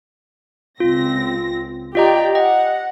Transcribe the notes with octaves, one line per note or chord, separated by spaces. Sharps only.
C#2 C4 F4 A#6
F4 G4 D5 D#5 G5 A#5
D#5 F#5